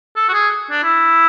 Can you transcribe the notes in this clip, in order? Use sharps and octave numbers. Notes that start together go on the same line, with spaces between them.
A4
F#4
G#4
D4
E4